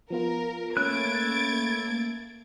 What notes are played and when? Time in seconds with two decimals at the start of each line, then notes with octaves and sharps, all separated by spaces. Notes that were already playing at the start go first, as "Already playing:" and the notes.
0.10 F3 B3 F4 A#4
0.77 A3 A#3 C#4 B4 F#6 G#6 A6 D7